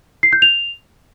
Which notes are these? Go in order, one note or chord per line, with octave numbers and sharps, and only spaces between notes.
C7
G6
F7